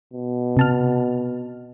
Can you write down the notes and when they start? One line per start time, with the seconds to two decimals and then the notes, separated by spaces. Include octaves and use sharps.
0.13 B2
0.57 C3 A5 F6